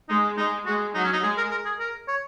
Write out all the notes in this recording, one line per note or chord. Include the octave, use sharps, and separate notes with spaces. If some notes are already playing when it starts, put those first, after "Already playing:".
G#3 D#4
G#3 D#4
G#3 F#4
F#3 D#4
C#4
D#4
G#3 G#4
A#4
A#4
G#4
A#4
C#5